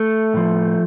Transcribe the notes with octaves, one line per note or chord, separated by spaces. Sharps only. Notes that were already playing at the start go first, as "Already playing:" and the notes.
Already playing: A3
A2 F3